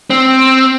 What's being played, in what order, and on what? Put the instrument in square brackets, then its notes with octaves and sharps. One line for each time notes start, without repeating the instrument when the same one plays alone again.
[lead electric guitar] C4